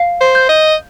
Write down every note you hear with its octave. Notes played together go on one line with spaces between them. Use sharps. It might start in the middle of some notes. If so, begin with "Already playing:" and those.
Already playing: F5
C5
G6
D#5